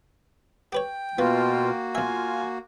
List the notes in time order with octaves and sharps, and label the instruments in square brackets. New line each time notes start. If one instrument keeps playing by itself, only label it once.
[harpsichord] G4 B4 C#5 [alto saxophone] G5
[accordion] B2 F4 [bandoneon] A#3 F#4 [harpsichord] B3
[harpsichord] B1 E5 [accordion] F4 [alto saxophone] G#5